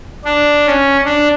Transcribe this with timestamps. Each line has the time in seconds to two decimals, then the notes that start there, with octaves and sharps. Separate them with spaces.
0.25 D4
0.67 C#4
1.05 D4